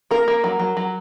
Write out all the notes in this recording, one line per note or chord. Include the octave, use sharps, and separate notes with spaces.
A#3 A#4
A#3
F#3
F#3
F#3